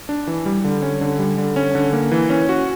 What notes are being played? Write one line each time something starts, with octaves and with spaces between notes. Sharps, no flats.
D4
E3
G3
D3
C#4
D3
G3
D3
C#4
D3
A#3
E3
C#4
F#4